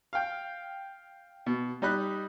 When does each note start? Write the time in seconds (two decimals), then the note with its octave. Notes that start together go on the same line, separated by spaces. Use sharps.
0.13 F5 G5
1.46 B2
1.82 G3 D#4 D#5 B5 F#6